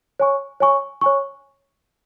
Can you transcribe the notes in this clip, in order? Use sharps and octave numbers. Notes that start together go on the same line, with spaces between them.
C#5 G#5 C#6
C#5 G#5 C#6
C#5 G#5 C#6